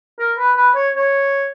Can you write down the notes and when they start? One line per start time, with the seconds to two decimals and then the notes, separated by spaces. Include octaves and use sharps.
0.19 A#4
0.38 B4
0.56 B4
0.75 C#5
0.95 C#5